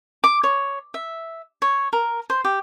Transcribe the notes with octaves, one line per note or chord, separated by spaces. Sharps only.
D6
C#5
E5
C#5
A#4
C5
G4